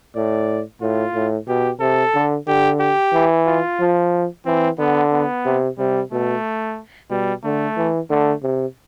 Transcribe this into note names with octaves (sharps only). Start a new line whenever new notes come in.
A2 D5
A2 F4
A2
B2 G4
C3 A4
D3
D3 G4
G4
E3
F4
F3
E3 C4
D3 B3
B3
C3
C3 G3
B2 A3
B2 G3
D3 A3
E3
D3 A3
C3